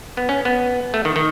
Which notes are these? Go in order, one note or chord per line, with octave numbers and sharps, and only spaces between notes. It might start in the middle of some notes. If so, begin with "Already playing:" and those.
B3
C#4
B3
A3
D#3
D#3